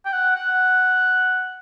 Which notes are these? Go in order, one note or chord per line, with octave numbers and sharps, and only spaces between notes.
G5
F#5
F#5